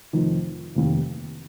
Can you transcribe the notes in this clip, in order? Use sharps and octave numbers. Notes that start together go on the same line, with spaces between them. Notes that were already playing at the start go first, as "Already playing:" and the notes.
F1 F2 D#3
F1 D#2 D#3